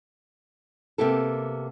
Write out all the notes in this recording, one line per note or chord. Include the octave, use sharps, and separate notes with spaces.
C3 A#3 B3 G4 A4